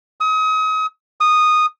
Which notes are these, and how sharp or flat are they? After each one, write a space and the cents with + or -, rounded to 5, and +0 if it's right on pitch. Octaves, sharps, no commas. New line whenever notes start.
D#6 +35
D#6 -10